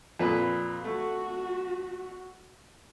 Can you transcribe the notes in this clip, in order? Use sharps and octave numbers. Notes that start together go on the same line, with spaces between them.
F2 A#2 B4
A3 F#4